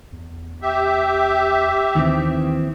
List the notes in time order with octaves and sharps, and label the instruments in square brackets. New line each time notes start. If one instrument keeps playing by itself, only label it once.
[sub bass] E2
[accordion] G4 E5
[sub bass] D#2 [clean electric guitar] D#3 E3 C4